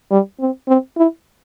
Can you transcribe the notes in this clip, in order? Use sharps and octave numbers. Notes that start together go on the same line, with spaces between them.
G3
C4
C4
E4